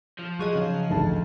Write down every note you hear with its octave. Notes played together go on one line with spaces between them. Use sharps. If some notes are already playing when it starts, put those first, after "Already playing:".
F3
F#3 G#4 D#5
C#3
A1 D2 A5